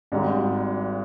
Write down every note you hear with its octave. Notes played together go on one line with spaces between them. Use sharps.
G#1 G#2 G3